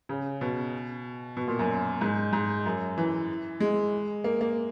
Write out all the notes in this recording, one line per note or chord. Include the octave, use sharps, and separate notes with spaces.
C#3
B2
B2
A#2
F#2
G#2
G#2
F#2
E3
G#3
A#3
A#3